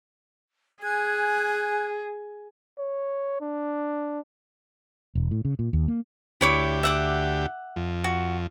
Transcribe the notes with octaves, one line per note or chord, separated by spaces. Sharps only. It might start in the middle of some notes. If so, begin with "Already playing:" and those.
G#4 G#5 F#6 G#6
C#5
D4
E1
A2
C#3
A#2
D#2
A#3
D2 E4 G4 C#5 D6
E5 F#5 D6
F2
F#4